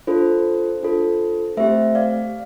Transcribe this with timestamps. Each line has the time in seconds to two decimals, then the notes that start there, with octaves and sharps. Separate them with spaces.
0.07 D4 F4 A4 C5
0.83 D4 F4 A4
1.57 A3 C4 G4 C5 E5
1.95 D5 F5